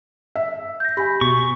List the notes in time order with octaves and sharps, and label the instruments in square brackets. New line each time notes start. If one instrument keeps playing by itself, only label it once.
[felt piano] E5
[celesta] G6 A#6
[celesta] G4 [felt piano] G#5 B5
[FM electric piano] B2 [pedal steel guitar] C#6